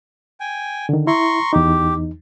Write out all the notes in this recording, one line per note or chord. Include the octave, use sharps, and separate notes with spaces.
G5 G#5
D3 D#3
E4 A#5 C6 C#6
E2 D#4 G4